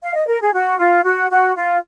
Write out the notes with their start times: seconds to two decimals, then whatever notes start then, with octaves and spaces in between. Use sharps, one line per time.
0.03 F5
0.15 D#5
0.28 A#4
0.41 G#4
0.54 F#4
0.79 F4
1.04 F#4
1.30 F#4
1.56 F4